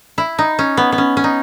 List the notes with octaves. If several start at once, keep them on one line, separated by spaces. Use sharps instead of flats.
E4
D#4
C#4
B3
B3
C#4
C#4
D#4